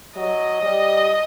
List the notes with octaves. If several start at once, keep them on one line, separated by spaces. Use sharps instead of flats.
F#3 D#5
G3